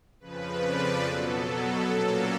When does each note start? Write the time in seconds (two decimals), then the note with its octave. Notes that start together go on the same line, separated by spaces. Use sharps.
0.20 F2 C#3 F3 B4
0.62 D5
1.03 B2 F#3 B3 A4
1.45 A4
1.87 A#2 F#3 A#3 C#4 A4